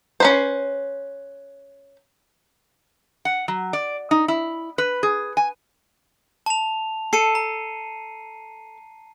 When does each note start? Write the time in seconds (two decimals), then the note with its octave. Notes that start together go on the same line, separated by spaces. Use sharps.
0.20 C#4 B4 C5
3.25 F#5
3.48 F#3
3.73 D5
4.11 D#4
4.28 E4
4.78 B4
5.03 G#4
5.37 G#5
6.46 A5 F7
7.13 A4 C7 C#7 D#7
7.35 A#5